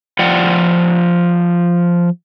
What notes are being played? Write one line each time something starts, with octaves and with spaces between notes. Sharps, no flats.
F3 F4 D5 F#5 G5